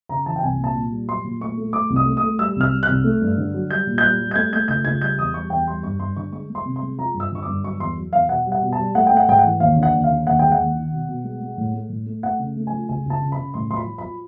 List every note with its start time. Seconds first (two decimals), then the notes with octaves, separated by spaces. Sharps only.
0.09 C#3 A#5
0.26 E3 A5
0.36 G5
0.43 C2 G#5
0.59 A#2
0.64 A5
0.75 A#2
0.91 G3
1.08 F#3 C6
1.24 A#2
1.41 A3 C#6
1.57 A3
1.73 A3 D6
1.90 C2
1.96 D#6
2.06 A3
2.17 D#6
2.23 A3
2.39 G3 E6
2.56 C2 F6
2.71 G3
2.83 F#6
2.88 C2
3.04 A3
3.21 G2
3.38 D3
3.54 F#3
3.70 G3 G6
3.87 A#2
3.98 G6
4.03 G3 F#6
4.19 G3
4.31 G6
4.36 A3 G#6
4.53 A3 G6
4.68 C#2 G6
4.85 C#2 G#6
5.01 G3 G6
5.18 E2 D#6
5.34 G3 C#6
5.50 E2 G5
5.67 G3 C6
5.83 G2 C#6
6.00 G2 C6
6.17 D3 C#6
6.32 G#3 C#6
6.50 G#3
6.55 C6
6.65 C3
6.76 C6
6.82 G#3
6.98 F3 A#5
7.14 G2
7.20 E6
7.31 D3 C#6
7.43 G2 D6
7.63 F#3 C#6
7.80 E2 C6
7.97 F#3
8.13 E2 F5
8.29 B2 F#5
8.46 G3
8.52 F#5
8.62 B2
8.73 A5
8.79 G3
8.95 A3 F#5
9.07 A3 G5
9.17 F#5
9.28 G#2 G5
9.39 F#5
9.44 E3
9.60 D#2 F5
9.76 D3
9.83 F#5
9.94 D#2
10.04 F5
10.10 D3
10.26 D#2 F#5
10.39 G#3 G5
10.52 F#5
10.59 D#2
10.75 D#3
10.92 B2
11.08 B2
11.24 G#3
11.41 G#3
11.58 A2
11.74 A3
11.89 A2
12.06 A3
12.23 A3 F#5
12.39 C#3
12.56 A3
12.67 F3 G#5
12.89 C#2 G#5
13.05 C#2 A5
13.22 C#3
13.32 C#3 B5
13.54 A2 C6
13.71 F3 C6
13.76 B5
13.87 F3
13.98 F3 B5